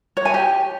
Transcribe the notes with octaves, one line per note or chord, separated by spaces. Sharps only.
C#5
G#5
G4